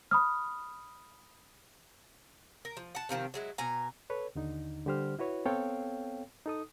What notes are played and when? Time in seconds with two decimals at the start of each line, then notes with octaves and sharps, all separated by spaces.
0.11 B5 D#6 F6
2.65 A#4
2.77 F3
2.95 F#5 A5
3.09 C3 D#3 F3 C4
3.34 F#3 G#3 E4
3.58 B2 G#5 A#5
4.10 A4 B4 C#5
4.35 D#2 D3 D#4
4.86 D3 G3 G4 C5 F6
5.19 E4 F#4 B4 C#5
5.46 B3 C4 A4 C#5 F5 G5
6.46 D#4 A4 D#6